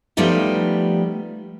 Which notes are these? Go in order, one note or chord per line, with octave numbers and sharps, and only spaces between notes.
F3 G3 A3 B3 D#4 G4